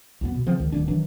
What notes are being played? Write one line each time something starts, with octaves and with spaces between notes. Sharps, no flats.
C2 F#2 B3
B2
C#3 F3 C4
C#2 D#3
D1 D#3 G3 D4
D#3 E3 F#3 D4